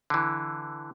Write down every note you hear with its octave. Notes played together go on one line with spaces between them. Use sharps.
D3 E3